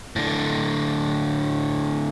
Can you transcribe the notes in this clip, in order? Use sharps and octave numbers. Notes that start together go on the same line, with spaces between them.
A2 D3